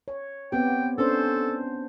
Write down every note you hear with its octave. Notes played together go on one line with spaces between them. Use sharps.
C#5
B3 C4 G4 G5
C#4 D4 A4 C5